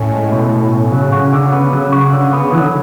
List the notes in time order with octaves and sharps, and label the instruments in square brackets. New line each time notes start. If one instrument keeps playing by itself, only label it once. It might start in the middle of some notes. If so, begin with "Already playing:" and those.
Already playing: [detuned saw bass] A2 [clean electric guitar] C#4
[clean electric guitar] G#3
B2
B2
C#4
[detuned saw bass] C#3 [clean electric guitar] F#3
[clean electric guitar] F#4
D3
B3
F#3
F#4
D3
B3
[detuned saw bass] E3 [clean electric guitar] F#3
[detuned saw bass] D3